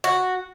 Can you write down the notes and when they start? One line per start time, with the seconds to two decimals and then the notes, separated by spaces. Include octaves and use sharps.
0.04 F#4